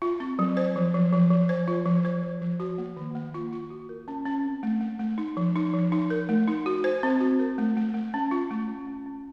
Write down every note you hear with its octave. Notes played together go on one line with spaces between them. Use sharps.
F4
C4
F#3
C5
F3
F3
F3
F3
C5
F4
F3
C5
F3
F3
F#4
A#3
D#3
A#3
F4
F4
F#4
A#4
C#4
C#4
C4
A3
A3
A3
D#4
F3
D#4
F3
D#4
A#4
A3
D#4
F#4
C5
C4
F#4
A#4
A3
A3
A3
C#4
F4
A3
C#4
C#4
C#4